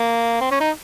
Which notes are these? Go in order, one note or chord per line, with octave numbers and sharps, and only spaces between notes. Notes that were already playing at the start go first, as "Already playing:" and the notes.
Already playing: A#3
C4
C#4
D#4